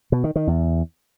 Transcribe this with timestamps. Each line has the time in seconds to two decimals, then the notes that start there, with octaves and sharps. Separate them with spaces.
0.12 B2
0.24 D#3
0.36 D#3
0.47 E2